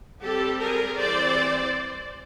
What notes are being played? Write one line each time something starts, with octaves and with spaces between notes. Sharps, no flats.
G3 C4 G4 A4
G#4 A#4
E3 G3 C4 C5 D5